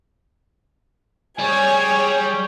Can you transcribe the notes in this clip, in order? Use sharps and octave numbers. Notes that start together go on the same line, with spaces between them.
G3 G#4 C#5 G#5